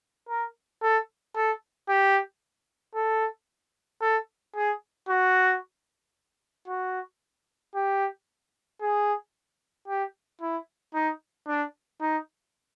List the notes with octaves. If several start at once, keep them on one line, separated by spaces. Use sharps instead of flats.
A#4
A4
A4
G4
A4
A4
G#4
F#4
F#4
G4
G#4
G4
E4
D#4
D4
D#4